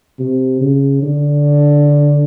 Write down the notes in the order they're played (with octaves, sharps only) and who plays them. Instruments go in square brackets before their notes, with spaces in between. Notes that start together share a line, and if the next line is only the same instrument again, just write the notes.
[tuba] C3
C#3
D3